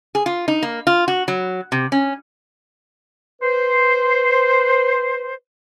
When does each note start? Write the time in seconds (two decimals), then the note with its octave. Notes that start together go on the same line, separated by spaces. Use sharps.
0.15 G#4
0.26 F4
0.48 D#4
0.63 A#3
0.87 F4
1.08 F#4
1.28 F#3
1.72 C3
1.92 C#4
3.42 B4 C5